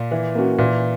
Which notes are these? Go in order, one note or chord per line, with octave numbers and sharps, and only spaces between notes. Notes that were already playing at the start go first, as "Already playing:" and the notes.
Already playing: A#2
E3
A#3 C#4 F#4
A#2 E3